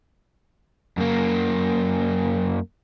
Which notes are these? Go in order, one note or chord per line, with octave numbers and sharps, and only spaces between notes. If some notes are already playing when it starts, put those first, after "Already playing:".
F#2 A#3